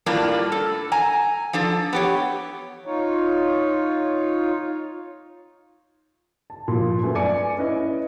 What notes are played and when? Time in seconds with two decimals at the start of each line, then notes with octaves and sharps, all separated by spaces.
0.06 A2 G3 A#3 D4 F4
0.52 A4
0.92 G#5 A#5
1.53 F3 D4 A4
1.93 B3 G4 C#5
2.86 D#4 F4 C#5
6.50 A5
6.68 A#2 F3
7.03 F#2 A3 B3
7.15 D5 G#5 D6 C#7
7.57 C#4 E4 B4 D#5